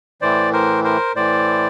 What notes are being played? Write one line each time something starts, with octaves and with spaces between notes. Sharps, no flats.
A2 E3 C5 D5
A#4 C5
A#4 C5
A2 E3 C5 D5